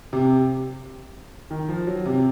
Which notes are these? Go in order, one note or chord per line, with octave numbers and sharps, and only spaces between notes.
C3
D#3
F3
F#3
C3